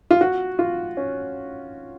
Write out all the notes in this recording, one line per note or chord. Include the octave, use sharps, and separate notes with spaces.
F4
F#4
F4
C#4